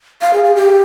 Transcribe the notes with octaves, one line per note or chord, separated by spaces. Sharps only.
F5
G#4
G#4
G4